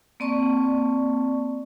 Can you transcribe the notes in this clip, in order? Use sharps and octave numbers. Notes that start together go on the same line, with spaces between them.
A#3 C4 D5 A5 C#6